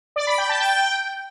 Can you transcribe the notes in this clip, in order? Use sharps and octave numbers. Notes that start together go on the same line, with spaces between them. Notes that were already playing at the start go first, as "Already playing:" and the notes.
D5
B5
G5
A5
G5